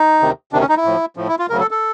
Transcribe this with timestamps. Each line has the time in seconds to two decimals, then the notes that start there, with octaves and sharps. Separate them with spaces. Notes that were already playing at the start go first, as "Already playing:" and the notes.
Already playing: D#4
0.20 D2 C3 D#3
0.53 D2 C3 D#3 D4
0.61 C#4
0.69 D#4
0.77 E4
0.85 A2 F3
1.16 A2 F3
1.28 E4
1.39 F4
1.49 D2 C#3 F#3 A#4
1.60 A4
1.71 A4